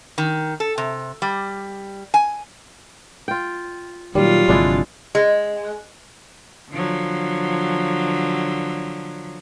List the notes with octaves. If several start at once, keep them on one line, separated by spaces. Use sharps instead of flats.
D#3
A4
C3
G3
G#5
F4 G5
A#2 D#3 F#3 G3 F4
G1 C3 F3 G#3 D4 E4
G#3
D3 F3 F#3